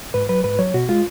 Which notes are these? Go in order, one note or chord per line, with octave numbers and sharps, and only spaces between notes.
G#2 B4
F#3 B4
G#2 B4
F#3 C#5
B2 F#4
G#3 F4